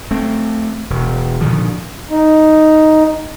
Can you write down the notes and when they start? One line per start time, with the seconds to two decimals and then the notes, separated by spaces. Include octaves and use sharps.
0.11 A3 C4
0.90 E1
1.41 A#2 D3 D#3 F3
2.10 D#4